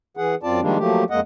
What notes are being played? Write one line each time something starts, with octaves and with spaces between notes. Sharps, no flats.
E3 G#4 F#5
F#2 C4 F4 D5 A5
D#3 F3 G3 G#3 A#3 D4
F3 F#3 A3 A#3 G4
F2 G#3 A#3 D#5 F#5